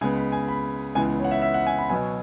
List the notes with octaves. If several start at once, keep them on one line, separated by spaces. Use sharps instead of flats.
C#2 C#3 G#3 B3 G#5
B5
G#5
B5
C#2 C#3 E3 B3 G#5
C#5
F#5
E5
E5
F#5
G#5
B5
B2 F#3 B3 G#5